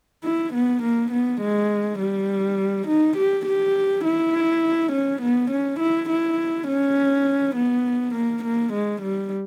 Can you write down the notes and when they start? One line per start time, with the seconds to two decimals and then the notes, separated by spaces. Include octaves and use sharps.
0.24 E4
0.54 B3
0.83 A#3
1.12 B3
1.41 G#3
1.99 G3
2.88 D#4
3.17 G4
3.46 G4
4.05 E4
4.92 C#4
5.22 B3
5.51 C#4
5.80 E4
6.10 E4
6.68 C#4
7.56 B3
8.15 A#3
8.44 A#3
8.73 G#3
9.02 G3